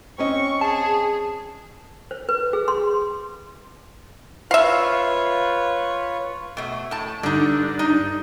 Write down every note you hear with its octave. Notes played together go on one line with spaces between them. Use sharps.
C4 C#4 D#5 C#6
G#4 A5
C5
B4
G#4
C6
F4 B4 C#5 E5 F5
B2 A3
A2 A5
G2 D3 D4 D#4
D#4